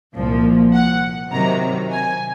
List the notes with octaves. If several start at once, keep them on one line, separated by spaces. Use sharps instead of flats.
C2 A#2 F3
F#5
C3 D#3 F#3 A#5
G#5